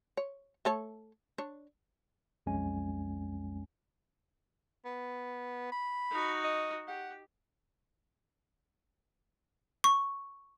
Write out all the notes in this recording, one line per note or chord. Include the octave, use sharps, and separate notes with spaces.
C#5
A3 A4 C#5
D4 C#5
B1 F2 G#3 C#4 G#5
B3
B5
D#4 F#4
D#5
G4 F#5
C#6